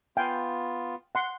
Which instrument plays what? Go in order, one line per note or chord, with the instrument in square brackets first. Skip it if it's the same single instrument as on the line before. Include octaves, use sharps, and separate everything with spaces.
[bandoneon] B3 F4 [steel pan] F5 G5 G#5
[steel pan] F#5 C6